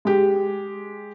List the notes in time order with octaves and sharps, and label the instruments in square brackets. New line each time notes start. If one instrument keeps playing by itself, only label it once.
[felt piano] G#3 G4